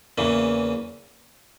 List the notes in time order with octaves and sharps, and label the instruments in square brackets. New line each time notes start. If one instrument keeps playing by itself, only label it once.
[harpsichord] E2 C#3 E3 A#3